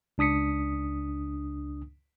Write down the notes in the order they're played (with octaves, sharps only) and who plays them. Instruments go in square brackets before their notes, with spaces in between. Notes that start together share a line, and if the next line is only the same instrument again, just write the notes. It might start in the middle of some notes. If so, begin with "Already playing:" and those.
[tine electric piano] C#2 D4 D#6 B6 C#7